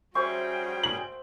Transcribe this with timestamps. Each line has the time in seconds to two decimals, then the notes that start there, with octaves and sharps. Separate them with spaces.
0.15 G3 C#4 F#4 G#4 C5 E5 G5 C#6
0.83 F#7